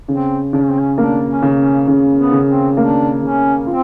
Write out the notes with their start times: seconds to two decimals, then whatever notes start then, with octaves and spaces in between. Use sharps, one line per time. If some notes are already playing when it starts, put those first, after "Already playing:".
0.08 C#3 C4
0.53 C#3 D4
0.61 C#4
0.71 C4
0.79 C#4
0.98 A#3 D4
1.28 C#4
1.42 C#3
1.58 C#4
1.88 C#3
2.18 B3
2.32 C#3
2.47 C4
2.77 A#3 D4
3.22 C#3 C#4
3.67 C4 F4